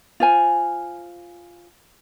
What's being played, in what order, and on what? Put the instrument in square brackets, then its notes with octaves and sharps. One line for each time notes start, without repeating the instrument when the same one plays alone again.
[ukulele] F4 C5 G#5